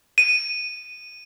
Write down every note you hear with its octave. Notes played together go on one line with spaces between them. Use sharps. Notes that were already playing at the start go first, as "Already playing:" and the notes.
D#7